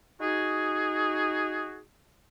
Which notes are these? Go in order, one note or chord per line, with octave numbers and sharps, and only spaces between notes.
D#4 F#4 G#4